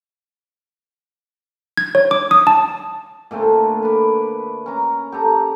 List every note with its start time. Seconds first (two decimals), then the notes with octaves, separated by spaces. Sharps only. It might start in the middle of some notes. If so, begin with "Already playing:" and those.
1.77 G#6
1.95 C#5
2.11 D6
2.31 D#6
2.47 A5
3.31 A#2 D3 A3 C4
3.83 B4 D5
4.66 C#4 A#5
5.12 G4 A4 A#5